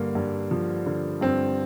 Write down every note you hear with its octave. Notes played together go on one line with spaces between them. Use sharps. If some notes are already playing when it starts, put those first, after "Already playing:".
Already playing: G2 D3 A#3
G2
F3
D3
G2 C4